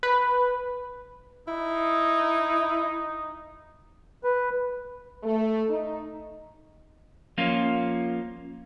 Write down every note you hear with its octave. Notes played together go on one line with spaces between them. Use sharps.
B4
D#4 E4
B4
A3
D#4
F3 A#3 C#4 F4